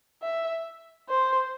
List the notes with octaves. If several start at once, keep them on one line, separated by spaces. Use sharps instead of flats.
E5
C5